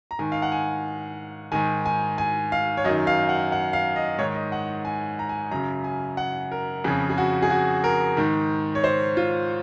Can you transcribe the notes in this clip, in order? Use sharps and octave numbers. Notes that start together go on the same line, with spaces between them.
A#5
G#2 D#3 G#5
F5
F#5
G#5
G#2 D#3 G#5
G#5
G#5
F5
C#5
F#2 D#3 D#5
F5
F#5
F#5
F5
D#5
G#2 D#3 C#5
D#5
F#5
G#5
A#5
G#5
F#2 C#3 A#5
G#5
F#5
A#4
F2 C#3 G#4
G#4
F#4
G#4
F#4
A#4
G#2 D#3
C#5
C5
F4